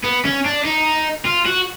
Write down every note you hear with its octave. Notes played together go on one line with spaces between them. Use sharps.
B3
C#4
D4
D#4
F4
F#4